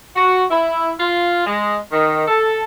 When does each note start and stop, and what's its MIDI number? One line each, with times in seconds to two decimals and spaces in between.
0.16 0.43 66
0.51 0.93 64
0.99 1.43 65
1.46 1.78 56
1.92 2.25 51
2.28 2.64 69